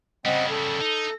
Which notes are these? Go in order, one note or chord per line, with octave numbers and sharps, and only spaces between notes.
C#3 G3 C4 D#5 F#5
A4
D#4